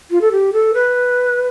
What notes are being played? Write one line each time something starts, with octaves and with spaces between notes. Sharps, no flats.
F4
A4
G4
A4
B4